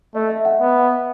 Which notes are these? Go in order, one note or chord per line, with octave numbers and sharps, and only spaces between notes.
A3 D#5
E5
F#5
B3